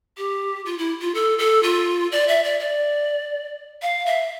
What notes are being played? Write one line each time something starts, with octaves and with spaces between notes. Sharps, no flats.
G4
F4
E4
F4
A4
A4
F4
D5
E5
D5
D5
F5
E5